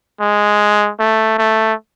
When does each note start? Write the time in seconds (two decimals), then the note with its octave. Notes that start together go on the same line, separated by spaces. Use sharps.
0.20 G#3
1.00 A3
1.38 A3